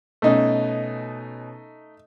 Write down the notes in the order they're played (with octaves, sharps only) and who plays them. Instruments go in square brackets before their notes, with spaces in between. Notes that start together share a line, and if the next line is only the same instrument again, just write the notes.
[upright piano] B2 C#4 [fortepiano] A3 D#4